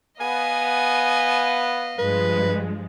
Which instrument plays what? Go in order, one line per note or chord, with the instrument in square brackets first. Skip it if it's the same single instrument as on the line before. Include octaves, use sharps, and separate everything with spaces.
[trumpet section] B3 [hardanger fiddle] D#5 F5 [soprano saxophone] G#5
[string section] G2 F3 G#3 [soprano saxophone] B4